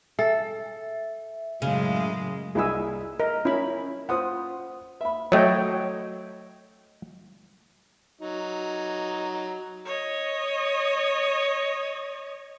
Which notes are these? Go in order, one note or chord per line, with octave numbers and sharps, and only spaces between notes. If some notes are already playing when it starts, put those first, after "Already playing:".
A4 E5
F#2 A2 C#3 G#3
C2 E4 G#4 D#5 G#5 E6
A#4 D#5
C#4 E4 B5
F4 C5 F#5 D#6
E5 B5
F#3 A3 C#5 D#5 G5
F#3 D#4
C#5 D#5